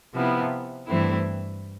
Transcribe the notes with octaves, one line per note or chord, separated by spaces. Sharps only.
C3 F3 B3 E4
G2 E3 A3 C4 E4